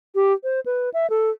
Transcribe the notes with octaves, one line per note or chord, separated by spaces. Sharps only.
G4
C5
B4
E5
A4